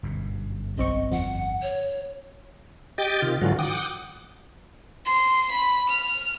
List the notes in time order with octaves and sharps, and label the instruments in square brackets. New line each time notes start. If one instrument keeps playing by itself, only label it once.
[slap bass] G1 F#2 B2
[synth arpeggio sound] B1 C4 C#6 [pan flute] D#5
[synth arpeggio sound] F2 [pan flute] F#5
[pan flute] C#5
[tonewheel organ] G4 D#5 G5 A6
C3 D#3 F4
G#2 D3 E3 F#3 F4 F#4
F#5 G5 D6 D#6
[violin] C6
B5
F6